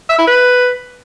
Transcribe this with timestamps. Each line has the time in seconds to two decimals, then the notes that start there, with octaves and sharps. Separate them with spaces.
0.10 E5
0.18 E4
0.27 B4